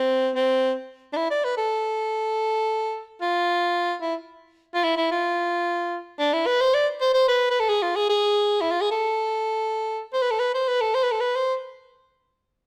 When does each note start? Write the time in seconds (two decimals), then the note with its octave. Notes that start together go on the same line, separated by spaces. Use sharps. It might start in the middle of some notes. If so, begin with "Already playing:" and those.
Already playing: C4
0.35 C4
1.13 D4
1.17 E4
1.30 D5
1.44 B4
1.57 A4
3.21 F4
4.02 E4
4.74 F4
4.84 E4
4.97 E4
5.11 F4
6.19 D4
6.33 E4
6.46 B4
6.61 C5
6.74 D5
7.01 C5
7.14 C5
7.28 B4
7.51 B4
7.60 A4
7.69 G#4
7.82 F4
7.96 G#4
8.09 G#4
8.61 E4
8.71 F4
8.81 G#4
8.91 A4
10.13 C5
10.22 B4
10.31 A4
10.39 B4
10.54 C5
10.68 B4
10.81 A4
10.94 C5
11.03 B4
11.12 A4
11.20 B4
11.36 C5